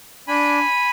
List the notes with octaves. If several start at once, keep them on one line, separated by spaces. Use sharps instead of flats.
D4 G#5 B5